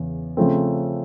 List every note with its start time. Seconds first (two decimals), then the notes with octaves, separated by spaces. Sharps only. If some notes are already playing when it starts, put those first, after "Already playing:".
Already playing: E2 C#3
0.37 C#3 F3 A3 C4